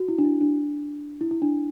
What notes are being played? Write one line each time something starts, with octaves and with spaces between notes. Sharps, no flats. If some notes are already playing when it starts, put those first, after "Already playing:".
Already playing: F#4
E4
D4
E4
D4
E4
E4
D4